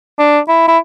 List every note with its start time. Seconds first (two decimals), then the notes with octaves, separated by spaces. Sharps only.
0.19 D4
0.49 E4
0.68 E4